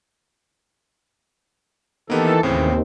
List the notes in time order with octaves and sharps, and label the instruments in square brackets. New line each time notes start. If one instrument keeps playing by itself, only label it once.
[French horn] D#3 [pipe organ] E3 A4 [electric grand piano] A#3 B3 G4
[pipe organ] D#2 [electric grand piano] A2 C#3 E3 [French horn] C4